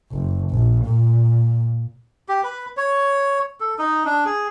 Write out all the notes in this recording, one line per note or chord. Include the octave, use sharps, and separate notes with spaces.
F#1
A#1
A#2
G4
B4
C#5
A4
D#4
D4
G#4